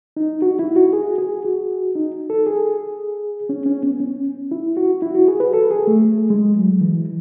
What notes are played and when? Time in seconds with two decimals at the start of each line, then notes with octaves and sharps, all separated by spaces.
0.17 D#4
0.42 F#4
0.59 E4
0.76 F#4
0.93 G#4
1.18 G#4
1.45 F#4
1.95 D#4
2.30 A4
2.46 G#4
3.49 C#4
3.66 C#4
3.83 B3
4.00 C#4
4.51 E4
4.77 F#4
5.02 E4
5.15 F#4
5.28 G#4
5.40 B4
5.53 A4
5.71 G#4
5.87 A3
6.05 A3
6.30 G#3
6.56 F#3
6.81 E3